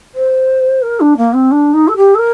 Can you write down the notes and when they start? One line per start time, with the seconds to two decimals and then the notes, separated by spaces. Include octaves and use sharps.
0.15 C5
0.82 A#4
1.00 D4
1.17 A#3
1.33 C4
1.51 D4
1.73 D#4
1.88 A4
1.96 G4
2.15 A4
2.19 A#4